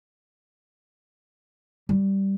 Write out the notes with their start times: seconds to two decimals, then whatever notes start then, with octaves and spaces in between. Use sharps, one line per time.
1.89 G3